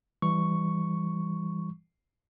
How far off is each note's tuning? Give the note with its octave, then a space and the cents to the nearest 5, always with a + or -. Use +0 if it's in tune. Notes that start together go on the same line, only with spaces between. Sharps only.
E3 +10 G3 +5 C#6 +0